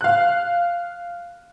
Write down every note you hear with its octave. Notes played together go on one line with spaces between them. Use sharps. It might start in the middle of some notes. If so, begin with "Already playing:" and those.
F5 F#6